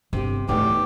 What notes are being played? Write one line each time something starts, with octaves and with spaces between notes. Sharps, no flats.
G1 C3 G4
E2 A2 D3 A3 D#4 G4